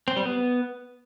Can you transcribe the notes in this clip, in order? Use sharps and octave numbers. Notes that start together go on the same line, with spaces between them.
C4
G3
B3